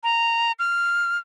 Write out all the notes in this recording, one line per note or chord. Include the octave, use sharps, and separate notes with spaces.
A#5
F6